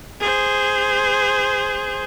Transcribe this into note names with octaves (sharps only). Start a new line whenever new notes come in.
G#4 C5